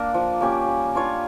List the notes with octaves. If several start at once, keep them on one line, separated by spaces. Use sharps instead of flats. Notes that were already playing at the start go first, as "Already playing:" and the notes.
Already playing: A#3 D4 A#4
F3
A#3 C#4 G4
G3
D4 F4 C#5